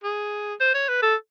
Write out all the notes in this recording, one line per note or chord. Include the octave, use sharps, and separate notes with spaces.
G#4
C5
C#5
B4
A4